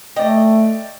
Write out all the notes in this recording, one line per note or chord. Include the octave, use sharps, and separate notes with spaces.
A3 D5 D#5 G5